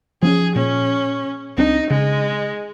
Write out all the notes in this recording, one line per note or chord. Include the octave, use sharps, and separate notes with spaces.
F3 C4 C#4 G#4
A#2 C#4
C2 C4 D4 D#4
C#3 G#3